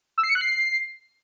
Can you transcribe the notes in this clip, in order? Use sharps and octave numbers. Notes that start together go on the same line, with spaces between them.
E6
C7
C#7
F#6
C7